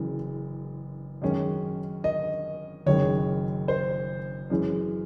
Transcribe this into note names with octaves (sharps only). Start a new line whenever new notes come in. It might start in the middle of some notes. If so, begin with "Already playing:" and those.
Already playing: F#1 F#2 E3 G#3
F#2 D#3 G#3 C#4
D#5
F#1 F#2 D#3 G#3 C#5
C5
F#2 E3 G#3 C#4